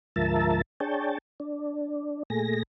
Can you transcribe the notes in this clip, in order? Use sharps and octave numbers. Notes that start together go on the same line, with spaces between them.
D2 G#2 F3 A#4 E5 A5
D4 G#4 C#5 G5 A5
D4
A#2 A3 G#4 A#6